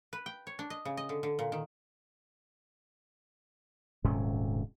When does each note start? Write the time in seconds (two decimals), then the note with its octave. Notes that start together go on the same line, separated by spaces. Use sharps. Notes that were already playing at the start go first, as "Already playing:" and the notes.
0.13 B4
0.26 G5
0.47 C#5
0.59 D4
0.70 D#5
0.85 C#3
0.97 D#5
1.09 D3
1.23 D3
1.39 A#2
1.52 D#3
4.04 D#1 G#2 C3 C#4